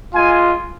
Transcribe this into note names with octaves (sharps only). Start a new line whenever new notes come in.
G#3 F4 G#5